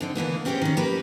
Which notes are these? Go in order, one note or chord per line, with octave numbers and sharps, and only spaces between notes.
D3 C4 D#4
D3 E3 A#3 B3
C4 C#4 G4 G#4 B4 C5
D#3 C#4
A#3 G4 B4